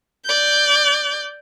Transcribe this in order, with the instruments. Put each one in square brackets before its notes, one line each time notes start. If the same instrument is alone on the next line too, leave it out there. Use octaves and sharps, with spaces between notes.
[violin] D5 G6